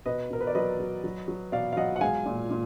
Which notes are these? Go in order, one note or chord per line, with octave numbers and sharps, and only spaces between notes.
B2 B4 D#5
B2 A#4
B4
D5
F#3 B4 D#5
F#3
F#3
F#3
B2 D5 F5
F5
F#3 D#5 F#5
F#5
G#3 F5 G#5
A#2
A#2